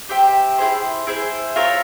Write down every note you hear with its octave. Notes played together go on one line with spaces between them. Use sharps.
G4 C5 E5 G5
E4 G#4 C5
E4 G#4 C5
F4 A#4 C#5 E5